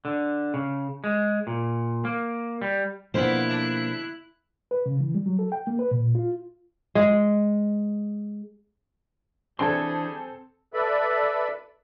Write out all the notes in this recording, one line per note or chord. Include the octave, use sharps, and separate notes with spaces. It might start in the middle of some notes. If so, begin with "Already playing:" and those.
D3
C#3
G#3
A#2
A#3
G3
B2 D3 F3 A#3 B3 E4 C5 F#6
D4
B4
C#3
E3
G3
F#3
A4
G5
A#3
B4
A#2
F4
G#3
E3 G3 C4 D4 G#4 A4 G#5 C6
A4 B4 D5 E5 B5